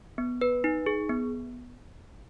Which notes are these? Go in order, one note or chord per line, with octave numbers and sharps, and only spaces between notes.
B3
B4
D#4
G#4
B3